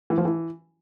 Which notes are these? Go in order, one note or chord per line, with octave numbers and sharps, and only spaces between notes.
E3
F3
E3